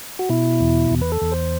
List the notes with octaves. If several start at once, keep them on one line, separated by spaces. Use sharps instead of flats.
F#4
B2 E4
E2
E2
B4
A4
E2
C5